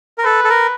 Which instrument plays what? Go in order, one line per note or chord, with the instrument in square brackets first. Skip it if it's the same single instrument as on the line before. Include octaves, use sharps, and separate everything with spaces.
[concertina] A#4
[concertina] A4 [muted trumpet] B4
[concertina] A4
A#4